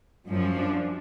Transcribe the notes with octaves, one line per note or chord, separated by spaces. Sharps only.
F#2 F3
D4